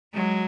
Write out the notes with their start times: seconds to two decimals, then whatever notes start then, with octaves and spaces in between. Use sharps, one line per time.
0.14 F#3 G#3